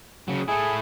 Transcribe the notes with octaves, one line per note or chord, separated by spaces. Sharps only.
C#3 F#3
A3 E4 G#4